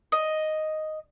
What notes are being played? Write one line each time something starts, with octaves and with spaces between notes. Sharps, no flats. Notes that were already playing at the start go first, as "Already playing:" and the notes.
D#5